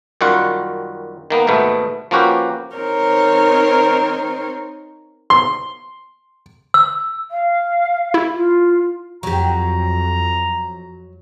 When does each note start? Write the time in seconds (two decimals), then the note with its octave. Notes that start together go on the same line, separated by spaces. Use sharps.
0.21 F#2 D#3 G3 F4 F#4 F#5
1.30 D#3 A#3 B3
1.47 D#2 G#2 B2 A3 B3
2.11 F3 A#3 C#4 F#4 G4 B4
2.77 C4 D#4 A#4 C5 C#5
5.30 C6
6.74 E6
7.31 F5
8.14 E4
8.33 F4
9.23 F2 F#3 G4 A#5